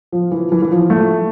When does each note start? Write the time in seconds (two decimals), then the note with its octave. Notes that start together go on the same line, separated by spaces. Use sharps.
0.12 F3
0.32 E3
0.52 E3
0.62 E3
0.71 F3
0.90 A3